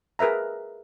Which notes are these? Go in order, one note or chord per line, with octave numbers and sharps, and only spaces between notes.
G#4 A#4 B4 E5 A#5